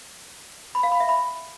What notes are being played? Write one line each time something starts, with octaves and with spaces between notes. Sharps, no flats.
B5
F5
B5
E5
B5